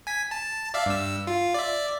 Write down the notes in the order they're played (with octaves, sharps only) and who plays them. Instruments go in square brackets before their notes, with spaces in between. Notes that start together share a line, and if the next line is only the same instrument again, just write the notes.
[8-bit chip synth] G#5 B6
A5
D5 E5 F5
G2 E6
F4
D5 E5